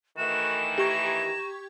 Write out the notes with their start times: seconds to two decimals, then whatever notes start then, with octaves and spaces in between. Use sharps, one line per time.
0.18 D#3 E3 A3 F#4 E7
0.78 G4 A#5 C#6 G#6